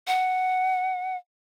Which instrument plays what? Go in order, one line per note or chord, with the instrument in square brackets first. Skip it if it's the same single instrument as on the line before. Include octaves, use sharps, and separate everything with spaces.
[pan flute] F#5